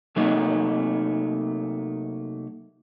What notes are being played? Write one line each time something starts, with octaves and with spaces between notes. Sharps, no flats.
C3 F#3 A3 A#3 D#4